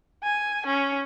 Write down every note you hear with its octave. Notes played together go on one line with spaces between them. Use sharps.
G#5
C#4